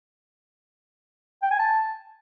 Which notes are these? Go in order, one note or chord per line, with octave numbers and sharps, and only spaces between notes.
G5
G#5
A5